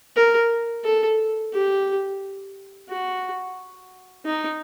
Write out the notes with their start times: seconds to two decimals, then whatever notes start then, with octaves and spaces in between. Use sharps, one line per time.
0.16 A#4
0.84 A4
1.53 G4
2.89 F#4
4.26 D#4